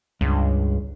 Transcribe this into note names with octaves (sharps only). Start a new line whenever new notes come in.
C#2 G2 D4